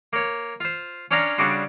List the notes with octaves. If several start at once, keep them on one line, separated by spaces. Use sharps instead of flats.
A#3 C#5
F4 C5
C#4 D4 C#5 F5 A#5
C#3 G3 D4 F#4 C6